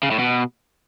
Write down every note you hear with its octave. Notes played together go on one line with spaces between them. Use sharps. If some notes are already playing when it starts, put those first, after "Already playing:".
C#3
A2
B2